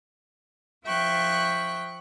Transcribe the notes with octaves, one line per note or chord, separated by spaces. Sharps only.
F3 E5 G5 C#6 F#6